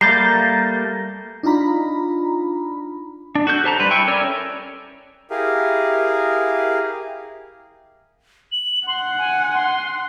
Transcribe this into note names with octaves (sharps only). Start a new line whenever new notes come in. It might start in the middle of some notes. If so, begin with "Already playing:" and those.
G3 A3 A#3 A#5 G6 A6 C7
D4 D#4 F4 A#5 B5
D4
F#4 A4 G6
G4 C5 A5 A#5
G3 B4 C5
E4 G5 C#6
C#4 A4 A#4 C#5 D5
E4 G4 G#4 A#4 F5
F#7
F#5 C6
G#5
C6